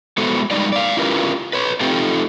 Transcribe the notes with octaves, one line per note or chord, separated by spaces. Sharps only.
G#3 A3 B3 F#4 A4 C5
G3 G#3 D#4 D5
D5 F5
C#4 E4 F4 G4 A#4 B4
B4 C#5
A3 C4 D#4 F4 G4 A4